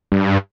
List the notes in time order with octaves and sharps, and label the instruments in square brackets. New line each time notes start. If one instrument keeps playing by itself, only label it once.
[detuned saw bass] G2